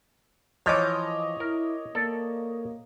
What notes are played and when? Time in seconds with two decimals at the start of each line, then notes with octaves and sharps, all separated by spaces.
0.66 E3 F3 C#5 D#5 D6
1.40 E4 A#4
1.95 A#3 A4 D5